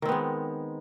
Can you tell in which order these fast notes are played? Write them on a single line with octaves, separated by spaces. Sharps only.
D#3 C4 B3 G#3